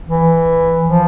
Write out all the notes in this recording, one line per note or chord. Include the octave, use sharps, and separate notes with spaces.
E3
F3